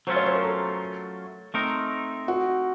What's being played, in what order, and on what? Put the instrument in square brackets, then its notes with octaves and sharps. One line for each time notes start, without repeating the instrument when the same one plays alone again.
[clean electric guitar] F#3 A3 C#4 F4 [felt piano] C5
[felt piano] C#5
C5
A#4
A4
[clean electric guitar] A3 C4 D#4 A#4
[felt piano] F#4